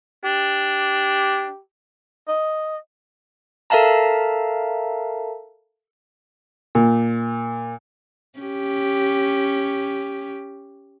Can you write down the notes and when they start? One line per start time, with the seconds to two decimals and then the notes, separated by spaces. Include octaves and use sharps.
0.25 D4 G4
2.28 D#5
3.70 A4 A#4 E5 F5 A5 A#5
6.75 A#2
8.39 C#4 G4